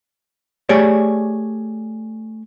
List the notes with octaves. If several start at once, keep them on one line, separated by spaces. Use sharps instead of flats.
A3 G4 G#4 C#5 D5